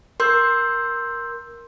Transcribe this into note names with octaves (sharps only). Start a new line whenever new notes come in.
A#4 C6 E6 G6